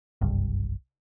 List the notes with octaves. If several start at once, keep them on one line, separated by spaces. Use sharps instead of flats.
F#1 C2 G2